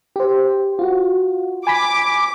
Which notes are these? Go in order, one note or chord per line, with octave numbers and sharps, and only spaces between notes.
G4 C5
F4 F#4
G#5 B5 D6 B6